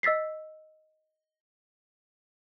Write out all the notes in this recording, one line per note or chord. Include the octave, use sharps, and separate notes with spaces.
D#5 E6 A6 B6 C7